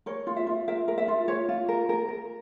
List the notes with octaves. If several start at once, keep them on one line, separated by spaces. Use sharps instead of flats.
A#4 C#5
F4
E5
F4
A#4 E5
A#4
E5
F4
F4 C#5
F4
A#4
A#4
A#4